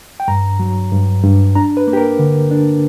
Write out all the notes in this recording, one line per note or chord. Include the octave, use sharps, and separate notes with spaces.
G5
G2 A#5
F#3
G2
G2
D4 A#5
B4
A#3
G4
A#4
D3
D4